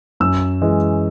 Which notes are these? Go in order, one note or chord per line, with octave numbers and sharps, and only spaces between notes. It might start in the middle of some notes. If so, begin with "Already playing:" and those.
F#2 E6
E3 G#3